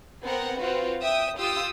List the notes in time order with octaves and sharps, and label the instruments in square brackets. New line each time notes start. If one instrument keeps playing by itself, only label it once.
[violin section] B3 C4 A#4 F#5
C4 F4 F#4 B4
E5 G5 D#6
F4 G4 D#6 E6